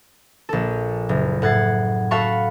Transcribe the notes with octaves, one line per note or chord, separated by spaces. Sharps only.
A#1 A4
F#1
A2 F#5 G#6 A6 C7
F#4 A4 F5 F#5 B5 C#6